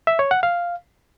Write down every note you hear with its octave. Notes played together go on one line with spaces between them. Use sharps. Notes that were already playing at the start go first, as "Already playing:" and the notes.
E5
C#5
F#5
F5